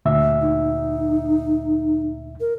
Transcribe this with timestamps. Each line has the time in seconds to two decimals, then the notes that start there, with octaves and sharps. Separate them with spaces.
0.05 D2 A#2 E5
0.41 D#4
2.40 A#4